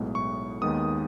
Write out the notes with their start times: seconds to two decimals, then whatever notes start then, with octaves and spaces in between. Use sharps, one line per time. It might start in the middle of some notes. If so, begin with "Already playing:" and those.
Already playing: B1 A2 G#3 B3
0.15 C#6
0.61 D#2 D#3 G#3 B3 D#6